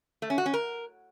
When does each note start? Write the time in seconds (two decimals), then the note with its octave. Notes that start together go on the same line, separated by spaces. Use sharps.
0.22 A3
0.30 C#4
0.38 F#4
0.46 C#4
0.54 A#4